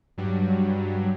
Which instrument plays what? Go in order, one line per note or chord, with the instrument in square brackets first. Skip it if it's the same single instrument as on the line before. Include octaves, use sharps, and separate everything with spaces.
[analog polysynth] G2 F#3 G3